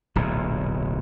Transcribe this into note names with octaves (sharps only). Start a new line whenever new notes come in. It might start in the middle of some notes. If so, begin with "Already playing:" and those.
D1 B1 A#2